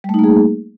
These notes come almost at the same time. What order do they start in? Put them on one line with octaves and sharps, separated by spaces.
G3 A3 D#4 A#3 G#4